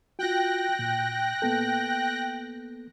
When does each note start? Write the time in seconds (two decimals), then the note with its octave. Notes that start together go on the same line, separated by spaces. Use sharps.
0.19 F4 F#4 G5 F#6 A#6
0.79 A#2
1.42 A#3 B3 A4